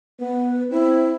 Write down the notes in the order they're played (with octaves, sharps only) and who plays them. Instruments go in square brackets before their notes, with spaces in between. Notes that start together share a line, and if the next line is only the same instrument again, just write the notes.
[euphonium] B3 [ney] B4
[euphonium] C4 [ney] E4